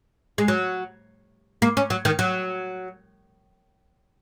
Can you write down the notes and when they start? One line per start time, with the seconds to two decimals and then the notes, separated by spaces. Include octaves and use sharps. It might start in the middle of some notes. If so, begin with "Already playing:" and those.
0.38 G#3
0.48 F#3
1.62 A#3
1.77 C#4
1.90 F#3
2.05 D#3
2.19 F#3